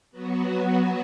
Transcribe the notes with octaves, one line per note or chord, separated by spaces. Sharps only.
F#3 B3 F#4